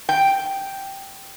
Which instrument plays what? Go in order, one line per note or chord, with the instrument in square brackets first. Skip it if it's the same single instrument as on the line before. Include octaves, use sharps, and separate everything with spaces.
[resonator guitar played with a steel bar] G5